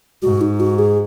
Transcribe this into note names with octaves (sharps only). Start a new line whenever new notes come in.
G#2 F#4
D#4
F#4
G#4